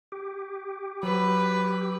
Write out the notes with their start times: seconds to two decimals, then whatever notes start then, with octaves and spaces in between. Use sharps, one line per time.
0.12 G4
1.03 F#3 B4